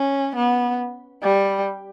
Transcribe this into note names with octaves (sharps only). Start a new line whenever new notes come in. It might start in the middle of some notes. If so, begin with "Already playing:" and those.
Already playing: C#4
B3
G3